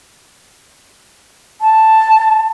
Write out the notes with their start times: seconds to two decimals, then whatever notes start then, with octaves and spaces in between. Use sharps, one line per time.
1.61 A5